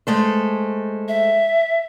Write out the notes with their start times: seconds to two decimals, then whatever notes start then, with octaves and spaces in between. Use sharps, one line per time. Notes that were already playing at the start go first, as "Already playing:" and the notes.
0.07 G#3 A3 C5
1.08 E5